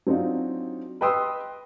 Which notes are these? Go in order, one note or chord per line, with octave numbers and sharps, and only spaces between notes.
F#3 C4 D4 D#4 F4
B4 D#5 G5 C6 D#6 E6